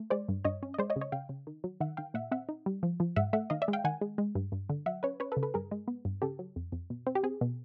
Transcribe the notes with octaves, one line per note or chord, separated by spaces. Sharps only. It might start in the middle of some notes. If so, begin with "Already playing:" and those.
Already playing: A3
G#3 C5 D5
G2
G2 C#5 D#5
C#4
D#5
G#3 C5 D5
C#5 D#5
C#3
C#5 D#5
C#3 F5 G5
C#3
D#3
F#3
D#3 E5 F#5
D#3 F5 G5
A#2 E5 F#5
C4 E5 F#5
D#4
G3
F3
F3
G#2 E5 F#5
A3 E5 F#5
D#3 D#5 F5
D5 E5
G#3
F5 G5
D#3 F#5 G#5
G#3
G#3
G2
G2
D3
F#3 E5 F#5
C#4 B4 C#5
C#4 B4 C#5
A4 B4
C#3
A4 B4
G2 G#4 A#4
G#3
B3
G2
C#3 G4 A4
F#3
F2
F2
B2
C4
G4
C4 G#4
B2